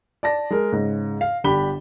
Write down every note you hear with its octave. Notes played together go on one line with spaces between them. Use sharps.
D5 A5 A#6
G#3 A#4
G#2 C#3
F5
G1 D3 D4 G4 B5 G7